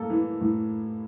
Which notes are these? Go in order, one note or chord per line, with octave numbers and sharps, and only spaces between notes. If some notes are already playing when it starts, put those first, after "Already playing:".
Already playing: A2 A#3 A4
E3
A2